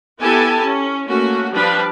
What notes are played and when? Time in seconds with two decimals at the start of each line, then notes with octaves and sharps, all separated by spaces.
0.20 B3 E4 G4 A4 G#5 A5
0.63 C#4
1.08 A3 A#3 C#4 F#4
1.53 F3 G3 D4 B4 F5